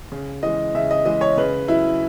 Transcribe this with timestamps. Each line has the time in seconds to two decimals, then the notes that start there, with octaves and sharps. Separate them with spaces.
0.12 C#3
0.43 E3 G#3 D#5
0.75 C#3 E5
0.91 D#5
1.05 E3 G#3 D#5
1.21 C#5
1.37 C#3 B4
1.68 F#3 E4